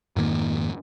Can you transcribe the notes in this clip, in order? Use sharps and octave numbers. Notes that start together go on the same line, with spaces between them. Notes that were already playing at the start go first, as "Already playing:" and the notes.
F2 G#2 D#3 A#3